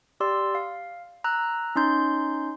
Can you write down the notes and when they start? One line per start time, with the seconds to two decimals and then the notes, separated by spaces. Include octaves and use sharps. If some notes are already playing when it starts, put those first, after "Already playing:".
0.20 G4 D5 C6 E6
0.55 F5
1.24 A#5 E6 F#6
1.76 C#4 D#4 C6 G6